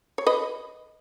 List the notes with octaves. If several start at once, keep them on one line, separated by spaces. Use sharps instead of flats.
C#5
B4 D#5